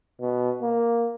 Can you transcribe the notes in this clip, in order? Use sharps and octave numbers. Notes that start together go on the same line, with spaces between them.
B2
A#3